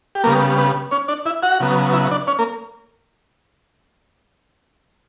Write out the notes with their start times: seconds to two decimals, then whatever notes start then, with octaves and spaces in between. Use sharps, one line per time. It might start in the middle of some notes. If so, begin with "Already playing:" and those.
0.15 G4
0.24 C#3 G3 A#3 B3 A#4
0.58 B3 B4
0.91 C#4 C#5
1.08 D4 D5
1.26 E4 E5
1.43 F#4 F#5
1.60 C#3 F#3 B3
1.93 E4 E5
2.11 D4 D5
2.27 C#4 C#5
2.39 A#3 A#4